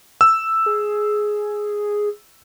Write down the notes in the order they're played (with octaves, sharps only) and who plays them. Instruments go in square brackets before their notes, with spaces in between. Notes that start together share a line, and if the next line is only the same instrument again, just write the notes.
[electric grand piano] E6
[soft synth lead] G#4